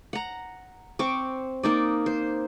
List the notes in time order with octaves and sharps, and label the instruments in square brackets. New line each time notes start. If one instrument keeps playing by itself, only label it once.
[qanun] F#5 A#5
C4 C#6 D6
A#3 D#4 D5
C5